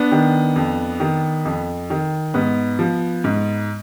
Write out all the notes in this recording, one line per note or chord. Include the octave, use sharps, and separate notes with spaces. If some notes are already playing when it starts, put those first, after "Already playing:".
Already playing: B3 D4
D#3
F2
D#3
F2
D#3
G#2 B3
F3
G#2